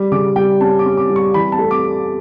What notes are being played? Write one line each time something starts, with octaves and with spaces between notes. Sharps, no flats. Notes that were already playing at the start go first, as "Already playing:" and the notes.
Already playing: G3
C#3 D6
G3 G5
C#4 A5
D6
C#4
D6
G3
C#6
E3 B5
A5
A3
D6